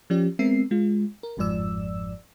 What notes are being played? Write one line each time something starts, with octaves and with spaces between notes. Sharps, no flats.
F3 C#4 G4 D5
G#3 B3 C4 A#4 E5 C7
G#3 F4
A#4
G1 F2 G#2 F3 D5 E6